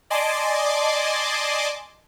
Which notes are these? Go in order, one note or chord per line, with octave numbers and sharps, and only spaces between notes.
D5 D#5 G#5 A5 C6 D6